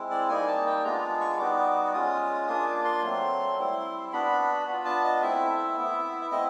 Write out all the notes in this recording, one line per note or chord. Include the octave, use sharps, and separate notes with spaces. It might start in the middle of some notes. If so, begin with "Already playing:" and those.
Already playing: G#3 C4 E4
D5
G3 A#3 D#4 G#5
A5
G5
G#3 B3 D4 F4 A#5
C#6
G3 B3 D#4 F#4 D6
G#3 C#4 F4 D#6
A#3 D4 F4 D#6
D6
C6
F#3 A3 C4
G3 C4 E4
B3 D4 F#4 B5
B3 D4 F4
A5
D#5
A3 C4 E4 E5
E5
B3 E4
E5
A3 C4 E4 D#5